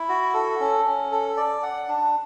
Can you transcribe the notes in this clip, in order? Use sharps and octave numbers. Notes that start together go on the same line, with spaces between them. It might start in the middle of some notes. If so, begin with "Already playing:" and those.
Already playing: E4
F#4
A4
C#4
C#4
A4
D5
F#5
D4